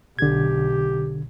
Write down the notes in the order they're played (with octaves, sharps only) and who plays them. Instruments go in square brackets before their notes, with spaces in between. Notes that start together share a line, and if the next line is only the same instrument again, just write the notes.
[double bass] B1 [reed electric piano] D3 G#6 [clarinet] G4